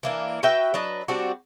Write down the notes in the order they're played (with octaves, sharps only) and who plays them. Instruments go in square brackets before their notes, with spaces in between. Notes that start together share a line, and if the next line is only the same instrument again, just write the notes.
[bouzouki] E3 A#3 D4
F#4 B4 E5 G5
F#3 D4 B4 D#5
G3 C4 D4 F#4